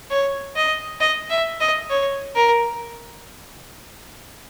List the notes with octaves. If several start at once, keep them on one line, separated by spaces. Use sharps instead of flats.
C#5
D#5
D#5
E5
D#5
C#5
A#4